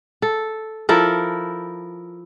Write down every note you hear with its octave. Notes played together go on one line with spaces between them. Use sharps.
A4
F3 E4 A4 A#4